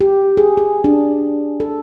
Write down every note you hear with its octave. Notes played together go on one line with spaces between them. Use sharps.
G4
G#4
G#4
D4
A4